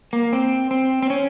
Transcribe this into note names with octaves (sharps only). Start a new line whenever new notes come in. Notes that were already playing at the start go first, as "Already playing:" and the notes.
A#3
C4
C4
C4
C#4